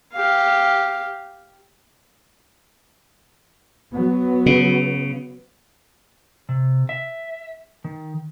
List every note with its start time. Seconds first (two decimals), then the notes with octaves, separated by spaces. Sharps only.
0.13 G4 F5
3.94 F#3 B3
4.46 C#3
6.49 C3
6.89 E5
7.84 D#3